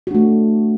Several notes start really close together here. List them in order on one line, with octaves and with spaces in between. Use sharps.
F#4 D4 A3